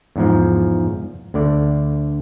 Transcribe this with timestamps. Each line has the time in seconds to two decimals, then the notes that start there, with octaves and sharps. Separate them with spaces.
0.16 E2 G#2 F3
1.34 D2 D3 D5